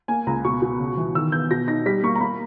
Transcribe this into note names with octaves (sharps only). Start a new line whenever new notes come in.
A#3 G#5
C#2 A#5
B2 C#6
B2
C#3
E3
D#3 E6
B3 G6
B2 A#6
D#4 A#6
G3 B6
A#3 C#6
A#5
A#3 B5